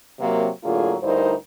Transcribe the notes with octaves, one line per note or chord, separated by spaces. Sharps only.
C3 F#3 A#3
A2 D3 F#3 A#3 F4 G#4
D2 G2 D#4 E4 A#4 C5